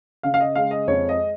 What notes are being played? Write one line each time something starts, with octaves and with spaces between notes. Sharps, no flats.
C#3 F5
F5
D#5
G#3 F5
D#5
F2 C#5
D#5